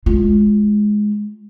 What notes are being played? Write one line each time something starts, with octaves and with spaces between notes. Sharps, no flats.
G#3 F4